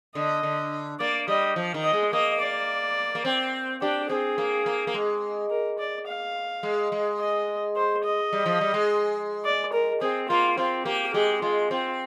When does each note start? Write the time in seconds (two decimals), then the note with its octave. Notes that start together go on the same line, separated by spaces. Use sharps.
0.15 D3 D#5
0.43 D3
1.00 A#3 D5
1.28 G3 D#5
1.56 F3
1.74 D#3
1.84 D#5
1.93 G#3
2.12 A#3 D#5
2.40 D5
3.15 A#3
3.25 C4
3.82 D4 G4
4.10 C4 G#4
4.38 A#3
4.66 A#3
4.87 A#3
4.94 G#3
5.51 A#4
5.79 D5
6.07 F5
6.63 G#3
6.92 G#3
7.19 D#5
7.76 C5
8.05 D#5
8.33 G3
8.46 F3
8.61 G3
8.74 G#3
9.45 D5
9.73 A#4
10.01 C4 G#4
10.29 A#3 F4
10.58 C4 F4
10.85 A#3 G4
11.13 G#3 G4
11.42 G#3 F4
11.70 C4 F4